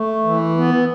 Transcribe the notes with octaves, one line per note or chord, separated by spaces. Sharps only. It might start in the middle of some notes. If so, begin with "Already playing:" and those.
Already playing: A3
E3
B3